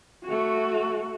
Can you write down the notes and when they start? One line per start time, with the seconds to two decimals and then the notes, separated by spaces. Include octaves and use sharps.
0.25 A3 F#4